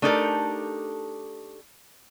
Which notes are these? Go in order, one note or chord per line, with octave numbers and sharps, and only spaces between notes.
A3 D4 D#4 G4 A4 A#4